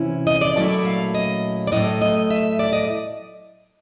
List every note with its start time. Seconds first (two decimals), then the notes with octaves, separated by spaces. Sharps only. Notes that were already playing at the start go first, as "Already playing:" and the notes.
Already playing: C3 E3 C#4 E4
0.27 D#5
0.41 D5
0.56 A#2 F#3 A3 C#4 E4 D5
0.85 F5
1.15 D#5
1.67 D5
1.72 A2 F#3 A3 D#5
2.02 D#5
2.31 E5
2.59 D5
2.73 D#5